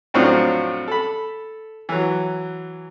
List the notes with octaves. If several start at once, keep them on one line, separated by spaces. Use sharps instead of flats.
F2 A2 F#3 C4 D4 F4
A4 B5
E3 F#3